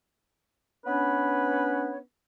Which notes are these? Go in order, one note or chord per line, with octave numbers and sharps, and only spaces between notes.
B3 C#4 D4 B4 C#5